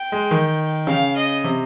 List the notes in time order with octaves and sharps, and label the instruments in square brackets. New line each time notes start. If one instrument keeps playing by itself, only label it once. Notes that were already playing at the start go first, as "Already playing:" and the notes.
Already playing: [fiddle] G5
[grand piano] G#3
D#3
[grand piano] C#3 [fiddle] F5
[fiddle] D#5
[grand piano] C3